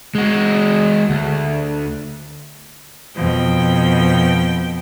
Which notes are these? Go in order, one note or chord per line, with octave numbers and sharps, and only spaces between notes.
G#3 F#4
D2
F2 B2 G5